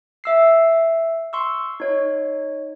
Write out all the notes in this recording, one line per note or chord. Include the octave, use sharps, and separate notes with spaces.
E5 E6 C7
C6 C#6 E6
D#4 C#5